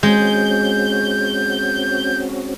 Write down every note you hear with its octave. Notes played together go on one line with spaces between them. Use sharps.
G#3 C4 C#4 F#4 G6